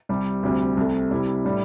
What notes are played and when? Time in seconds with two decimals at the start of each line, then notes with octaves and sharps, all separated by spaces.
0.09 C2 C3 G3
0.43 D2 C3 G3 C4
0.77 C2 C3 A3
1.11 C3 G3 C4 E4
1.45 A2 G3 D4